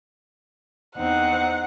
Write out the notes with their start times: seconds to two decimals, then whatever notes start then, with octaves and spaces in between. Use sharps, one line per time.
0.96 E2 C4 D#4 F#5